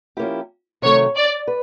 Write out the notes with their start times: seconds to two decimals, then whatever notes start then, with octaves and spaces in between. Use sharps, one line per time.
0.17 F3 A#3 C#4 E4 G4
0.82 C3 D#3 F#3 A3 C#5
1.16 D5
1.47 B4